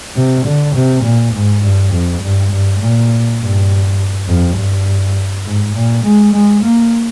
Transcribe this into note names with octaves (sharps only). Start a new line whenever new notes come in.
C3
D3
C3
A#2
G#2
G2
F2
G2
G2
A#2
G2
F2
G2
G#2
A#2
G#3
G#3
A#3